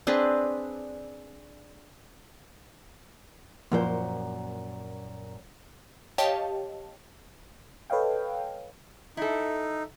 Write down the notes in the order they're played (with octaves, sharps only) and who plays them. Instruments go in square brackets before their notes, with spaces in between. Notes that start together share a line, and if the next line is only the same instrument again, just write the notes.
[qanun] C4 D4 G#4 B4
[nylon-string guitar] F#2 A#2 C5 [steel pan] F3 A#3
[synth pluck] G4 C#5 D#5 F5 G5 A5
[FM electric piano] A4 B4 C#5 D#5 F5 G5
[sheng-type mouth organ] D#4 [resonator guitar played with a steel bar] E4 A4